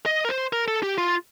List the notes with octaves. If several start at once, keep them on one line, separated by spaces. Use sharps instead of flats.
D#5
A#4
C5
A#4
A4
G4
F4